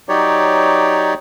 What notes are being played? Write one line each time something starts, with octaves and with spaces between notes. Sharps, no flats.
F#3 D#4 G4 C#5 D5